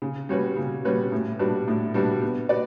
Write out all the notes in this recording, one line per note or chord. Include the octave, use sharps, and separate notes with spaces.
C#3
G3 C#4 F#4 B4
C#3
G3 C#4 F#4 B4
A2
G3 D4 F#4 B4
A2
G3 D4 F#4 B4
B3
F#4 B4 D5